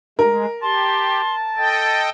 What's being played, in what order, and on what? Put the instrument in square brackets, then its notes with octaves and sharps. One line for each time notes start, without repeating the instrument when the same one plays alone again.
[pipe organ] G#3 [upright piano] A#4
[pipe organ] G4 [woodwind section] A5 [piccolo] C6
[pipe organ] A4 D#5 G5 [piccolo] A6